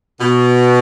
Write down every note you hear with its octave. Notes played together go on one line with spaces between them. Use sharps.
B2